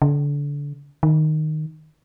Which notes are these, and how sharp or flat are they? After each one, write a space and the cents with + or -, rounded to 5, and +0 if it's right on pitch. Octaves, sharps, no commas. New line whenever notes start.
D3 -30
D#3 -10